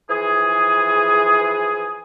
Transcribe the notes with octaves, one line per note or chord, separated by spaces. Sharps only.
E3 F3 G#4